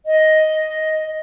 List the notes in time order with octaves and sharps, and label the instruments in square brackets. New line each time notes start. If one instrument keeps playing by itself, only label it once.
[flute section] D#5